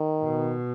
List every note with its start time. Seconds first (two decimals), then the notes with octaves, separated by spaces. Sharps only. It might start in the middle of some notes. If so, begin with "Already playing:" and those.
Already playing: D#3
0.23 B2